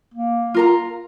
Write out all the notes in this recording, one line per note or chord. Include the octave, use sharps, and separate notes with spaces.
A#3
F4 A#4 A#5